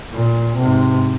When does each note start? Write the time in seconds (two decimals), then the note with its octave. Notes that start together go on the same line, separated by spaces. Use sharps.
0.12 A#2
0.58 G#2 C3